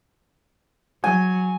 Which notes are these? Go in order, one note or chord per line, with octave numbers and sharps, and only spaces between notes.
F#3 G#5